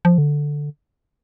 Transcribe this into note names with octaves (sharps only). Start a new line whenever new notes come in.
F3
D3